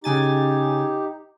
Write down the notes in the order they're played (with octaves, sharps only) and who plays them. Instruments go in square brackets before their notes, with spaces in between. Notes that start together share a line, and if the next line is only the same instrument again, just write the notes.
[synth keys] C#3 G#5 A6 [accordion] D#4 G4